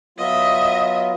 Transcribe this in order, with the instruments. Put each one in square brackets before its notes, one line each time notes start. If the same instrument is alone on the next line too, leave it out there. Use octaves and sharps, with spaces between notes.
[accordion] F#3 B3 F4 [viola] D#5 E5